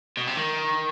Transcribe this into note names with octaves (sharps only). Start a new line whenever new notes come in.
B2
C3
D#3